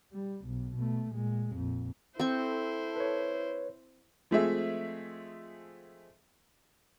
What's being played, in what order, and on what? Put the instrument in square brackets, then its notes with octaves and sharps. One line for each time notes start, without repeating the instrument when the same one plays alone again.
[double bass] G3
B1
B2 A3
A#2 G#3
A#1 F2
[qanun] C4 C#6 [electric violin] E4 C5 [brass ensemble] A4
[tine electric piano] B4 C#5
[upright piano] F3 G#3 A3 C4 G#4 E5